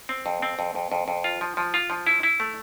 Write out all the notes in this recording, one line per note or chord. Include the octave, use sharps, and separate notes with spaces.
C4
F2
C4
F2
F2
F2
F2
F4
F3
F3
F4
F3
E4
E4
A3